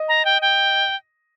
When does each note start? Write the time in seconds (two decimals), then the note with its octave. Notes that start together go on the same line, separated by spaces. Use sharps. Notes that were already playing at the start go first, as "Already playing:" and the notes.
Already playing: D#5
0.08 A#5
0.25 G5
0.42 G5